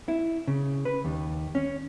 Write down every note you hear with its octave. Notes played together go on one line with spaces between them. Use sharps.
E4
C#3
B4
D#2
C#4